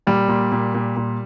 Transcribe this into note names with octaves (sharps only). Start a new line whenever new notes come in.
A#2 G3
A#2
A#2
A#2
A#2